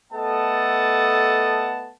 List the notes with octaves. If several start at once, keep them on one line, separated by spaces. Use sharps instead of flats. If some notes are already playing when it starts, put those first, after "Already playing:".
A3 B3 A4 D#5 F#5 A5